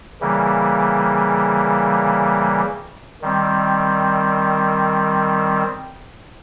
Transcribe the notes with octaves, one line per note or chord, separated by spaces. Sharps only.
C#3 E3 G3 A#3
D#3 G3 C4